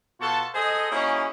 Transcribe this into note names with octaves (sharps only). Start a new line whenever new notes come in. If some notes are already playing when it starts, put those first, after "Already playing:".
B2 F4 F#4 A4 A5
G#4 A4 C5 D#5
A#3 C#4 D#4 E4 F#4 G#4